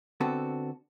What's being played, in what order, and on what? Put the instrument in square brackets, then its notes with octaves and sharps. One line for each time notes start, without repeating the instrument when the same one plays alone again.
[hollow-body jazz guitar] D3 B3 C4 F#4 A4